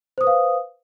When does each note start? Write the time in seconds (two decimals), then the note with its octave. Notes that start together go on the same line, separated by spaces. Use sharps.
0.18 C5
0.21 D#6
0.24 B4
0.27 F5